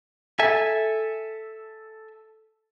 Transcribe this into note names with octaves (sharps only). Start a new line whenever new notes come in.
A4 E5 G#5